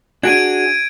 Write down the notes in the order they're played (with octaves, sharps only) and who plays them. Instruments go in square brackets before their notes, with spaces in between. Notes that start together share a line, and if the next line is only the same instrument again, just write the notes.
[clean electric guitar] D4 F#4 G#4 [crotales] G#6 D7 D#7